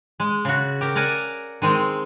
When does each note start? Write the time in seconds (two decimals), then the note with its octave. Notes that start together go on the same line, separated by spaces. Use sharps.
0.20 G#3
0.45 C#3 F#4
0.81 G4 A#4
0.95 A#4 D5 F#5 G#5
1.62 D#3 G#3 C4